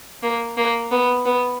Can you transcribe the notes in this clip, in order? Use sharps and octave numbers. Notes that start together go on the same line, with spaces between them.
A#3
A#3
B3
B3